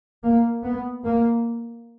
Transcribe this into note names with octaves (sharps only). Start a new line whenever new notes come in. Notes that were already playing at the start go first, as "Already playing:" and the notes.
A#3
B3
A#3